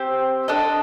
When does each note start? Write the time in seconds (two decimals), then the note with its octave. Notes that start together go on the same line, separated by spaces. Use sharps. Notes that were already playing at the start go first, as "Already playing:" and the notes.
Already playing: C4 G4 C5
0.48 D4 A4 D#5